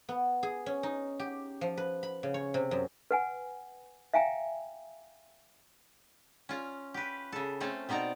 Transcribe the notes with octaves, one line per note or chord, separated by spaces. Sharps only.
B3
G#4
C#4
D#4
G4
F3
B4
B5
C#3
C#5
C3
F#2
B4 F#5 G#5
E5 F5 G5 G#5 A#5
C#4 F4
G4 B4
C#3 A4
A3 C4 C#4 A4
B2 C4 D#4 D5 A#5